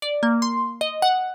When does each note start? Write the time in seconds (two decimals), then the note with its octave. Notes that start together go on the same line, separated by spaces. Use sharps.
0.02 D5
0.23 A#3
0.42 C6
0.81 D#5
1.02 F#5